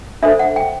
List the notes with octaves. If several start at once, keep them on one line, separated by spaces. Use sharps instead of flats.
D4 A4 C5 E5
F#5
G5